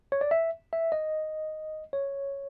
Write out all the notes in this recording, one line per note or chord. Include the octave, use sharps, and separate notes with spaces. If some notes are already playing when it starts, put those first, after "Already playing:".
C#5
D5
E5
E5
D#5
C#5